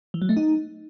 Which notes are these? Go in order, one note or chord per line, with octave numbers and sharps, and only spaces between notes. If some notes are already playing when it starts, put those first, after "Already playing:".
E3
F#3
A3
D#4